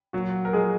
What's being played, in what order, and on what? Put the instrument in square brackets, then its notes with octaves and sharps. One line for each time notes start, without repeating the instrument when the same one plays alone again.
[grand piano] A#2 F#3 F#4
A#4
F3 G#3 G#4